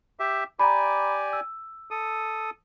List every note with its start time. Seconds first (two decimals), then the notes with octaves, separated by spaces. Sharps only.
0.20 G4 E5
0.59 G4 D5 G#5 A#5 B5
1.33 E6
1.91 A4 D#6